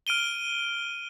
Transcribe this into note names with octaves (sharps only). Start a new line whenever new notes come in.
F6 D7 D#7 G7